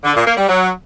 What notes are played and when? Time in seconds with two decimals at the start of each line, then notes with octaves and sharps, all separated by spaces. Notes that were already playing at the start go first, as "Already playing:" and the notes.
0.04 D3
0.15 A#2
0.26 A#3
0.37 G3
0.48 F#3